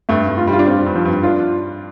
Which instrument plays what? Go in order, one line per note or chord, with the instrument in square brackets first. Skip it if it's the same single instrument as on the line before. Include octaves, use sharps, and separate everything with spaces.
[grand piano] G2 [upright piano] A3
[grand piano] G2
[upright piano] F4
[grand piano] G3
[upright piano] F4
D4
[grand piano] C4 [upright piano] F4
[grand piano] G2
[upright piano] F3
[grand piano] G2
[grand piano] D4 [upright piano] F4